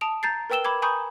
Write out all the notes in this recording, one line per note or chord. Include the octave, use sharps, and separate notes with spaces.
A5 D#6 D7 F7
A#5 G6 A6 C7
A#4 B4 G5 E6 E7 G7
B5 D6 G#6
G#5 A#5 B5 C#6 D#6 G6